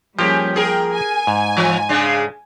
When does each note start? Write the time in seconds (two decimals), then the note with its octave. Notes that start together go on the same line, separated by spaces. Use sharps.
0.19 F3 G3 A#3 C#4 G4 G#4
0.56 G#4 A#4 G5
0.92 G#5
1.27 G#2
1.57 E3 F3
1.89 C#3 G#3 D4